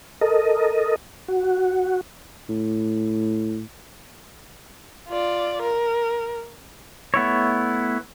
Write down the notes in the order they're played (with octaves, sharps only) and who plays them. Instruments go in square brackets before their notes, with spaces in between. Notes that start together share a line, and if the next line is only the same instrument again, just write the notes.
[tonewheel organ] A4 A#4 D#5
F#4
[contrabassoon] A2
[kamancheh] F4 D5
A#4
[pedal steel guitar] A3 B3 E4 C#5